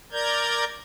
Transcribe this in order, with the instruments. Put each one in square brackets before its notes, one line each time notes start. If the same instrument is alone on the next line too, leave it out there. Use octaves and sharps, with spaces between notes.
[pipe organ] A#4 D5 A#5 G6 G#6